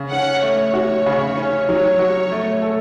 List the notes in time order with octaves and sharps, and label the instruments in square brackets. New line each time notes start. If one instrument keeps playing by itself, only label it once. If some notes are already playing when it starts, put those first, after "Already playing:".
Already playing: [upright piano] C#3
[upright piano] C#4 [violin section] F#5
[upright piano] A3 [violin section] C#5
[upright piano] F#4
C#3
C#4
[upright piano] F#3 [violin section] C#5
[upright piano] F#4
A3
A4